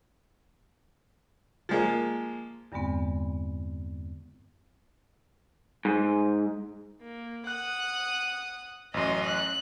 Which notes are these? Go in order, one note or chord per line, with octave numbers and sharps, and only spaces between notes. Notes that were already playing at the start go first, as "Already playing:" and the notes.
F3 G#3 A#3
E2 G2 D3 G#3 B3 C4
G#2
A#3
F#5 D#6 F#6
A1 F#2 D#5 C6
F#6